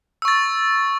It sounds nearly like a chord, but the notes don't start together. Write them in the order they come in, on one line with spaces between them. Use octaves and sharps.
E6 C#6 A6